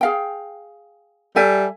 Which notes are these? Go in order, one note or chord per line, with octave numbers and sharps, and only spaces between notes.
G#4 F5 G5
G3 A4 E5 G#5